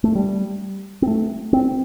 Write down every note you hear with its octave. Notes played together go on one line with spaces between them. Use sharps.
A3
G3
C4
A3
C4